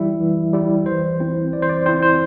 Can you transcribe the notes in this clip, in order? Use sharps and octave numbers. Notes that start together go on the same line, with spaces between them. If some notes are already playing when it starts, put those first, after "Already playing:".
Already playing: E3 G3 E4 E5
E3
G3 E4
E3 C5
C4 E4
E3 D5
C5
D5
C4 E4 C5
C5